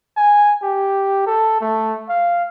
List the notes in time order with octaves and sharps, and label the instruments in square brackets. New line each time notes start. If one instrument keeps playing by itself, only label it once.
[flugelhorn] G#5
G4
A4
A3
F5